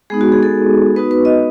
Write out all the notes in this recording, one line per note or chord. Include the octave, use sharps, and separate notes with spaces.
G#3 B3 D#4 G#4
F#4
G#4
A4
B3 D#4 F#4 B4
B4
D#5